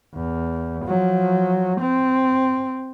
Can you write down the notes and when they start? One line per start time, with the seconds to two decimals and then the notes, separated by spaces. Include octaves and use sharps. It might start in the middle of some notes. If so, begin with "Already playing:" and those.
0.15 E2
0.85 F3 F#3
1.81 C4